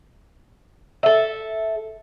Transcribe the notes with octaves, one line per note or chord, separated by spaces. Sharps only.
A4 E5